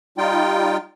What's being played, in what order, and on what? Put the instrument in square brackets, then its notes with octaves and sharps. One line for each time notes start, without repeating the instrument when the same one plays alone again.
[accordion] G3 D#4 F4 G5